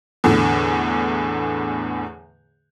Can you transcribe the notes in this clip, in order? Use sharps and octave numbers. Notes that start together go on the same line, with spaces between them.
E2 A2 D3